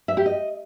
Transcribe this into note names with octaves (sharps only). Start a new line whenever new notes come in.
E5
G4
D#5